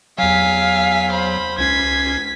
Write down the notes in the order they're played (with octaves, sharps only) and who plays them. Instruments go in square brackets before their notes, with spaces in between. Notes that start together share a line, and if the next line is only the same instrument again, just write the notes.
[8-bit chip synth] E2 F#3 [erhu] F5 [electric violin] G#5 B6
[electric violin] C5 B5
[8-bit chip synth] C#2 C#4 C7 [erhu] G#6 [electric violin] B6